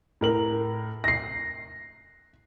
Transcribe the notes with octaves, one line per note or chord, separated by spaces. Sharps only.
A2 A#4 F#7
A#6 C7